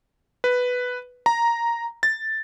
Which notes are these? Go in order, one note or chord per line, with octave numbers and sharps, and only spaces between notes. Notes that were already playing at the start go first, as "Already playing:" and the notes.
B4
A#5
A6